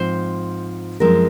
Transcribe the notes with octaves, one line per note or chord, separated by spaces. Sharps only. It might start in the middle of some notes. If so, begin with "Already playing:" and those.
Already playing: G#2 F3 C4 C5
F#2 F3 G#3 C4 A#4